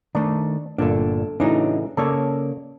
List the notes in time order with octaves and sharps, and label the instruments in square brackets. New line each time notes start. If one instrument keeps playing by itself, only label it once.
[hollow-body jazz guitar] D#3 A3 [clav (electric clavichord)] D4
[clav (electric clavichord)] G1 A#2 [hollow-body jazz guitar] D4 A4
[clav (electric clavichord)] A2 C#3 E3 [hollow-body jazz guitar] D4 D#4 F#4
[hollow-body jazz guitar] C#3 A#3 C#5 [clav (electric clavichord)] A4 D5